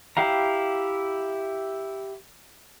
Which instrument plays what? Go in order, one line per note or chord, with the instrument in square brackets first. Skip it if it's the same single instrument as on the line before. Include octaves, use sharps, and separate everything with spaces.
[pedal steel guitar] E4 G4 F5 A#5